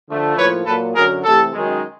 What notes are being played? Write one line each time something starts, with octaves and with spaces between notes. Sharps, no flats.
D3 F3 A3
A2 F3 A#3 B4 C#5
A#2 F#3 A#3 A4 B4
F#2 D3 F#3 G#4 A#4
C3 E3 A3 G4 A4
F#2 D#3 G#3